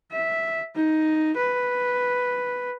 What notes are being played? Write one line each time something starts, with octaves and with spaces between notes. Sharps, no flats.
E5
D#4
B4